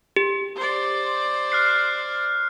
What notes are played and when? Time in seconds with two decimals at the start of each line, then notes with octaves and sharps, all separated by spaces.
0.16 G4
0.57 C5 D5
1.52 F6 F#6 C7